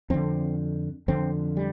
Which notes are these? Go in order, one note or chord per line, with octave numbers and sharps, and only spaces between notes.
F2 D3 C4
F2 D3 C4
G3